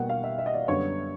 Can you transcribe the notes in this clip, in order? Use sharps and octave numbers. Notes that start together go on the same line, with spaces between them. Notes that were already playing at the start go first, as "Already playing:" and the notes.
Already playing: B2 G3 A#3 F#5 G5
F5
E5
E5
D#5
D5
F#2 D3 G3 B3 C#5